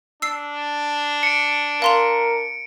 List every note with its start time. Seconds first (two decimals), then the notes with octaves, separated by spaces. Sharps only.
0.22 D4 E6 C7
1.23 C#7 D7
1.82 A#4 F5 C6 F7